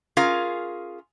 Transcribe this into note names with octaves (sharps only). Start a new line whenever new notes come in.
C#4 F4 G#4 A#4 F5